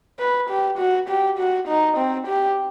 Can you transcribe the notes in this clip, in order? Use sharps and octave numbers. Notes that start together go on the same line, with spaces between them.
B4
G4
F#4
G4
F#4
D#4
C4
G4